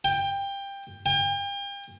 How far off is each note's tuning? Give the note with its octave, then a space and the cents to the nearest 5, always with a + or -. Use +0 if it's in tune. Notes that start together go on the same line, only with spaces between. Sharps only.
G5 +20
G5 +40